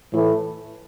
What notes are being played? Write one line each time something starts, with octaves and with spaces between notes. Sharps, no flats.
A2 E3 A3 E4